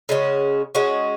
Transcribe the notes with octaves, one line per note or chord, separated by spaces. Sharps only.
C#3 G#3 C#4 F#4
G#3 C#4 F#4